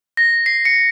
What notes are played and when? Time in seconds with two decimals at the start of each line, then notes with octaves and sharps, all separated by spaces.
0.17 A#6
0.46 C7
0.65 C#7